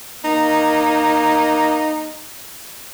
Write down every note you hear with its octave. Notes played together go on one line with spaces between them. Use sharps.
A#3 D#4